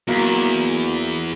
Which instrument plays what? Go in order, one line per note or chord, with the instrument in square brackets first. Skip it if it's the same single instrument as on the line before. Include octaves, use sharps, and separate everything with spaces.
[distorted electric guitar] E2 [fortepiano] F#3 A#3